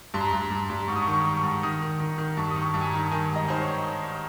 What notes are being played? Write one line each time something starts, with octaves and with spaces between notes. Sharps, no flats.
G2 C6
A#5
G2 C6
G2
G2
G#2 C#6
D#6
C#6
D#3
C#6
D#3
C#6
G#2
D#3 D#6
D#3
D#3
D#3
G2 C#6
D#6
D#3
C#6
G2
G#5
A#5
D#3
D#3 G#5
G#2
D#5
D#3 C5
C#5